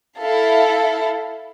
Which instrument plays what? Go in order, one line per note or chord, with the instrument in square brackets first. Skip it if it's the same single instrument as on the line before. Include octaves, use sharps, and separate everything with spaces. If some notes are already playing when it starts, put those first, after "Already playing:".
[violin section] E4 A4 F5